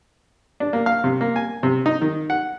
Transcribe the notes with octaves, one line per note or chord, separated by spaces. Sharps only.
D4
A#3
F5
C3
A#3
G#5
C3
D#4
D#3
F#5